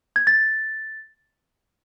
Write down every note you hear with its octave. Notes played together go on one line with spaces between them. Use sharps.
G#6
A6